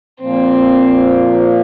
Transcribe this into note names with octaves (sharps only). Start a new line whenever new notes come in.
A#2 F3 A#3 C4